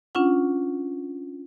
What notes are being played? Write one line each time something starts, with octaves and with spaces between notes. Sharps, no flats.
C#4 D4 F4 F#5